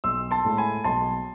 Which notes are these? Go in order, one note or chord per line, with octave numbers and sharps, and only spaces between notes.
B1 C6 E6
A5 C6
A2 G#3
G#5 B5
B1 A5 C6